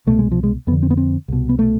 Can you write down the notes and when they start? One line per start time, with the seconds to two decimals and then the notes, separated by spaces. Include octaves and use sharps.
0.07 C2 B2 A3
0.19 G#3
0.32 F3
0.43 G#3
0.67 F2 B3
0.71 D3
0.83 C4
0.90 B3
0.97 C4
1.28 C2 B2
1.49 B3
1.59 A3